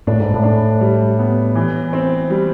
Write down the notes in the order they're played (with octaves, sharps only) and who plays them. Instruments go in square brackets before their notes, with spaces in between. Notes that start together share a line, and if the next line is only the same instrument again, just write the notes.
[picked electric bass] A2 [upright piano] D4
[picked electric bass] G#2
A2
[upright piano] D4
G3
B3
E3
C4
G3